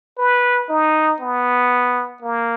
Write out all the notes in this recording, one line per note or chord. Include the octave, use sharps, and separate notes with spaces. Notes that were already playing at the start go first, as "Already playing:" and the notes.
B4
D#4
B3
A#3